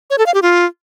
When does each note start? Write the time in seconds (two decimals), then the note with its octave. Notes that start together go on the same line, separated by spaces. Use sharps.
0.10 C#5
0.18 A4
0.26 F5
0.34 G4
0.42 F4